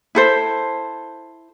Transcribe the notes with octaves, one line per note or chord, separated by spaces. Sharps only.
E4 A4 C5